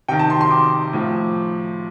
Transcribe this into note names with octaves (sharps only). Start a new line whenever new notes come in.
C3 D#3 G5
A5
C6
C6
D6
A2 F3